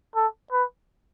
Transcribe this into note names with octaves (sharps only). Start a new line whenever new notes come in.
A4
B4